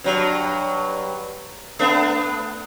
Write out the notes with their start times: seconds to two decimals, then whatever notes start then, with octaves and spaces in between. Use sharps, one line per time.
0.04 G2 F#3
1.79 A3 B3 D4